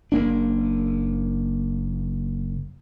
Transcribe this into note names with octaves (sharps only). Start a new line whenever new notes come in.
F#1 A#3 D4